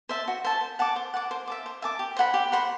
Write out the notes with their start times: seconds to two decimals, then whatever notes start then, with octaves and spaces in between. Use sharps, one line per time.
0.09 C5 E5 A5
0.28 F#4
0.44 C5 E5 A5
0.61 C5
0.79 F#5 A5 D6
0.96 C5
1.14 F#5 A5 D6
1.31 C5
1.47 E5 A5 D6
1.66 C5
1.82 E5 A5 D6
1.99 G4
2.17 C5 F#5 B5
2.34 G4
2.52 C5 F#5 B5